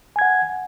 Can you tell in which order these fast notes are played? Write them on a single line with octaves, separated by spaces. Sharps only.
G#5 G#6 F#5